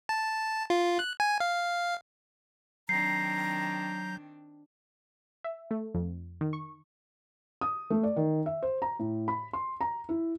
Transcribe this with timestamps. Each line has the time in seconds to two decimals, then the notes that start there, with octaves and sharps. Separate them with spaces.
0.09 A5
0.70 F4
0.99 F#6
1.20 G#5
1.40 F5
2.89 D#3 F#3 C4 D4 A#5 G6 C7
5.44 E5
5.71 A3
5.95 F2
6.41 D#3
6.53 C#6
7.61 D#6
7.90 A3
8.03 D5
8.16 D#3
8.46 E5
8.63 C5
8.82 A#5
8.99 A2
9.28 B5
9.53 C6
9.81 A#5
10.09 E4